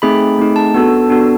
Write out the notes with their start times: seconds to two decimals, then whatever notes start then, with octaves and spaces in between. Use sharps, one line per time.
0.02 A3 C4 D#4 G#4 B5
0.21 B5
0.39 A3 C4 D#4 G#4
0.56 A5
0.74 B3 D4 F#4 A4
1.10 B3 D4 F#4 A4